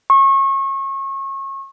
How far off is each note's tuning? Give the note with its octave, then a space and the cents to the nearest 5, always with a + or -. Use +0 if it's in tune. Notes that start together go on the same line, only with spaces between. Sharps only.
C#6 -30